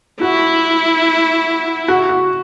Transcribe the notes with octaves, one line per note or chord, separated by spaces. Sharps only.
E4 F#4
F#4
F#4